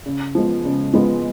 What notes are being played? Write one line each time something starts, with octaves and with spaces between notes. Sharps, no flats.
C#3
F3 G#3 B3
C#3
F3 G#3 B3